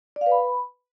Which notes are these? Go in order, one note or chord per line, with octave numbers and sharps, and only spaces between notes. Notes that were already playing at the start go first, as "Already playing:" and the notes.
D5
F5
B4
B5